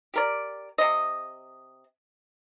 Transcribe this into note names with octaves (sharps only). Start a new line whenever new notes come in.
G4 A#4 D5
C3 D#5